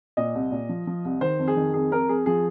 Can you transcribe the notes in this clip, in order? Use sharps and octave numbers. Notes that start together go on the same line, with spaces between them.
A#2 D#5
C2
A#2
F3
F3
C2
D#3 C5
F2
G#4
D#3
F2 G#4
F2 A#4
F2 G#4
F3 G#4